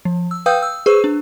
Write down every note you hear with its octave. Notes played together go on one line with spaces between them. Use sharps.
F3
E6
B4 F5 G5 D#6 E6 G6
E6
G#4 B4 C5 C#6 E6
D4